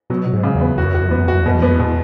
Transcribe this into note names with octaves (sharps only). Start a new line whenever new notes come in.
B2 F#3
F#3
G#2
C#3
E2
B3
E2 F#4
F#2
E2 F#4
F#2
E2 B3
F#2
E2
F#2 F#4
E2
F#2 B2
E2
F#2 B3
E2
B2